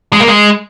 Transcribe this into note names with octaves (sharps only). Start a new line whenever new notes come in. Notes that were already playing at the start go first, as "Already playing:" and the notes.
G#3
A#3
G#3